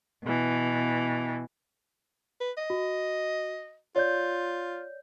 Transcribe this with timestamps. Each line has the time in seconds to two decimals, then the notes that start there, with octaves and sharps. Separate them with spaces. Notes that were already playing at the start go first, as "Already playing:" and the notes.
0.23 B2 E3
2.41 B4
2.58 D#5
2.70 F#4
3.96 F4 C#5 D5 G6